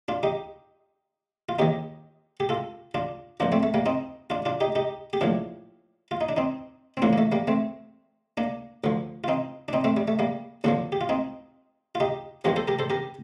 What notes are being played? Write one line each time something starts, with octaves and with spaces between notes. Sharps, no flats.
D4 F4
D#4 G4
F4
D#2 D#3 D#4 G4
G4
F4 A4
D4 F4
A#1 A#2 F3 A#3 D4
A3 C4
A3
G3 A#3
C4 D#4
D4 F4
D4 F4
D#4 G4
D#4 G4
G4
A#1 A2 F3 D4 F4
F4
D#4
D4
C4 D#4
C4
A1 A2 F3 A#3 D4
A#3
A3
G3 A#3
A3 C4
A#3 D4
D2 D3 F3
F4
C4 D#4
D4
C4 D#4
A3 C4
G3
A3
G3 A#3
D#2 D3 F3 A#3 D4
G4
F4
C4 D#4
F4
D#4 G4
A#1 A#2 F3 G4 A#4
A4 C5
G4 A#4
A4 C5
G4 A#4